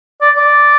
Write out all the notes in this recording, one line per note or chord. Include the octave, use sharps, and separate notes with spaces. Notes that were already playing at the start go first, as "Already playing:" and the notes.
D5
D5